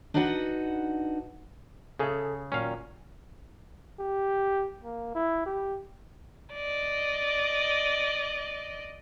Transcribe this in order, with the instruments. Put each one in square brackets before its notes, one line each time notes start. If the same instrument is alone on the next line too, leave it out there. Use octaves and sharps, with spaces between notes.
[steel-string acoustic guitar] D4 D#4 F#4 B4 F#5
[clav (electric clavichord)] C#3 G#4 [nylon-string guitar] A4 E5
[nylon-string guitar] A#2 D#3 F#3 [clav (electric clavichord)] C#4 F5
[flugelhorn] G4
A#3
E4
G4
[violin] D5 D#5